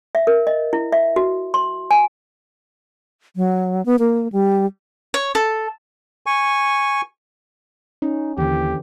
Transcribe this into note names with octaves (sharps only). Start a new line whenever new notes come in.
E5
A#4
D#5
E4
E5
F#4
C6
G#5
F#3
B3
A#3
G3
C#5
A4
G#5 C#6
C#4 D#4
D#2 D3 E3 G4